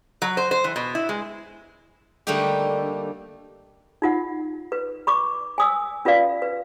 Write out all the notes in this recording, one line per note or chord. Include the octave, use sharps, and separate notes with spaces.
F#3
C5
C5
E3
B2
E4
G#3
D3 G3 A3 A#3 D#4 G4
D#4 F4 F#5
B4
B5 C#6 D6
G#5 D#6 E6
C#4 F4 B4 D5 F5
B4